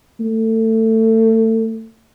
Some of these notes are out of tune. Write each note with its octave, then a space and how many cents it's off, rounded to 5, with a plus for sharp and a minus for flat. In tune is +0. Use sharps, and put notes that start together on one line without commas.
A3 +25